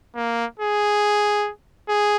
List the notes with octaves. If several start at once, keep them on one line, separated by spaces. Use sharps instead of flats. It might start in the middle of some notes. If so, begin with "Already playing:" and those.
A#3
G#4
G#4